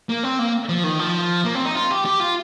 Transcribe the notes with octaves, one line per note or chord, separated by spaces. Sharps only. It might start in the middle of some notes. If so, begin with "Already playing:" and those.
A#3
C4
A#3
F3
D#3
F3
A#3
C4
D#4
F4
G4
G4
F4